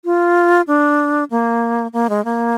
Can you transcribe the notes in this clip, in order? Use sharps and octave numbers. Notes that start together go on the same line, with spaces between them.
F4
D4
A#3
A#3
G#3
A#3